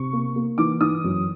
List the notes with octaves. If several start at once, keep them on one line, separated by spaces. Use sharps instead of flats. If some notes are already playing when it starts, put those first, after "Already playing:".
Already playing: C3 C#6
A#3
A#3
E3 D6
E3 D#6
F#2